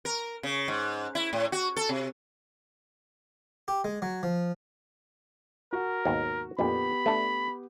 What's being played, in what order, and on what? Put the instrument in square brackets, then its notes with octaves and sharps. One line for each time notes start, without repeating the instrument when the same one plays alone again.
[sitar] A#4
C#3
G#2
E4
A2
F#4
A4
C3
[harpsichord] G4
G#3
F#3
F3
[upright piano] F#4 [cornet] A#4
[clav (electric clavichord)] D#2 G#2 B2
[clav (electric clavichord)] F2 A#2 D3 [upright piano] B3 G4 [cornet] B5
[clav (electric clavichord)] A3 D4